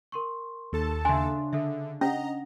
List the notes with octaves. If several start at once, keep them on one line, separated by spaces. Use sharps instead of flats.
A#4 C6 C#6
D#2 A4 A5
C#3 D4 E5 G#5 C6
D3 A4 E5
C#4 D#5 F#5 A#5 A#6